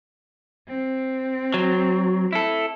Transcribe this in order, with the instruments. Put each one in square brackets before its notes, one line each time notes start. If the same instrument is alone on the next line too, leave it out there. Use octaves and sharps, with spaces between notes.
[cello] C4
[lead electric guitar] F#3
E4 A4